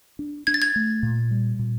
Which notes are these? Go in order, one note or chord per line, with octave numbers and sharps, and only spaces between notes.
D4
D4 G#6
A6
G#6
A3
A#2
G3
A#2